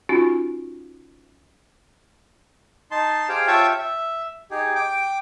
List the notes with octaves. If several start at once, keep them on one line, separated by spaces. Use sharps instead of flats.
C#4 D#4 F4 F#4
D#4 A5 C6
G4 G#4 C5 F5 G5
F4 C#5 E5 G5 A5
E5
D#4 G4 G#4
G5 D6